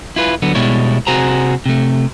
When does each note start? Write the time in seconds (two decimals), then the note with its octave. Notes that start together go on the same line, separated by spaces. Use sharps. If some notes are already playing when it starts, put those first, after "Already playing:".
0.16 E4 F4 B4
0.42 D3 F#3 B3
0.55 B2 G3 G#3 E4 C#5
1.07 C3 F#4 G#4 C5 A#5
1.66 C3 A3